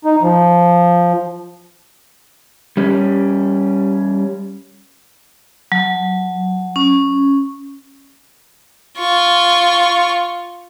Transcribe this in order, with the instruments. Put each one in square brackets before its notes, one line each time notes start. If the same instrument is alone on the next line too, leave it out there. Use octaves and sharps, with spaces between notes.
[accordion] D#4
F3
[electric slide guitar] G3 C#4
[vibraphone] F#3
C#4
[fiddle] F4 C#6